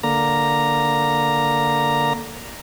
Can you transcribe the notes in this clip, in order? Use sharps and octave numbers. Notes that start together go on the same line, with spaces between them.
D3 A#3 A#5